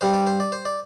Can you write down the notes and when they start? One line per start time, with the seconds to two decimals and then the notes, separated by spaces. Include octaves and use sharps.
0.01 G2 G3 C4 C5
0.14 D5
0.27 C5
0.40 D5
0.52 C5
0.65 D5